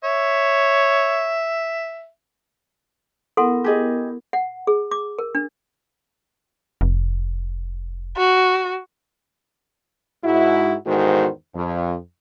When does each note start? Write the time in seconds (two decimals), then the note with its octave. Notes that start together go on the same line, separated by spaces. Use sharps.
0.04 C#5 E5
3.37 B3 E4 A4 A#4 F#5 C6
3.64 G4 G#4 D#5
4.33 F#5
4.67 G#4
4.91 D6
5.19 A#4
5.35 D4
6.81 F1
8.18 F#4
10.25 G#2 E4 F#4
10.86 E2 G#2 D#3 F#4 A4 C5
11.55 F2